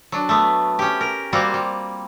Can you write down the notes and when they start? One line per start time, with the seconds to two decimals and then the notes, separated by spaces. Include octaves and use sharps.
0.12 F#3 D4
0.29 A3 B3
0.79 C#4 G4
1.01 A#4
1.33 G3 A#3 C4 F4 F#4
1.54 G3